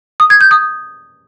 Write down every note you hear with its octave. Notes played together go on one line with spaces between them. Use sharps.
D#6
G#6
G6
D#6